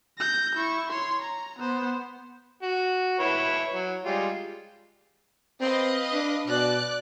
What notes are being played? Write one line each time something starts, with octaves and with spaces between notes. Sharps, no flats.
G6 A#6
E4 C#6
C#5 C6
A#5
B3 C5
F#4
E4 B4 C#5
F#3
G3 G#3 F4
C4 B4 D#5 F5
D4
B2 D5 F#6